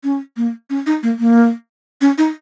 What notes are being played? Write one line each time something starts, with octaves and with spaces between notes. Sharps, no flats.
C#4
A#3
C#4
D#4
A#3
A#3
C#4
D#4